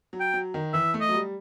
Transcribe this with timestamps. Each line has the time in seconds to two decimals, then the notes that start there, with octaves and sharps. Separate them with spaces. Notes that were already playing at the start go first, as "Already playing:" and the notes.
0.13 F#3
0.20 G5
0.34 F#3
0.54 D#3
0.74 E3 E5
0.94 A3
1.01 D#5
1.09 F#3
1.14 G3